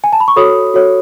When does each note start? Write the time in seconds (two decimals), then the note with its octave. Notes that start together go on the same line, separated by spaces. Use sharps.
0.04 G#5
0.13 A5
0.20 B5
0.28 C#6
0.36 F#4 A4 C#5 B5 D#6
0.74 F#4 A4 C#5